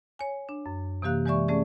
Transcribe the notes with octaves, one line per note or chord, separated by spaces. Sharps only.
C#5 G#5
D4
F#2
C3 E3 A#3 G4 F5 F#6
E3 G#3 G4 D5 E5 C#6
A3 C#4 G#4 D5